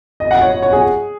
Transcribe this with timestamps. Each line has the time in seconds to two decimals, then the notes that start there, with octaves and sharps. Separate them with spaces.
0.20 D#5
0.31 F#5
0.41 C#5
0.52 C#5
0.62 C#5
0.73 G#4